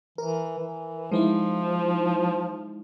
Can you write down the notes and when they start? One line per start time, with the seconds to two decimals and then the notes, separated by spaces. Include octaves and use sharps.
0.18 E3 A#4
0.59 E3
1.12 F3 G#3 D#4 E4